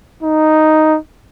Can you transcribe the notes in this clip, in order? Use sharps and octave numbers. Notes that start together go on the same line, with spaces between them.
D#4